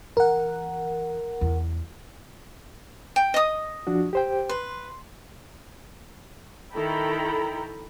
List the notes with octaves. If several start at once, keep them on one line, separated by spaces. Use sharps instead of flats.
E3 A#4 F#5
E2
G5
D#5 D#6
F3 D4 F#4
G4 C5 G5
B4 C6
D#3 E4 A4 G5 A#5 B5